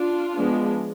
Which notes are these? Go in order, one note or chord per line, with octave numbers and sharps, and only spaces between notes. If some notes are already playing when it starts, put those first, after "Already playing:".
Already playing: D4 F4
F3 G#3 B3 D4